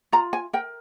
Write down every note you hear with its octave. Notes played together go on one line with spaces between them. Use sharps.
F4 A#5
G#5
A#4 G5